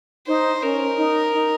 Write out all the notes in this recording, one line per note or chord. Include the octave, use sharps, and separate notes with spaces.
D#4 C5
C#4 A#4
D#4
D#4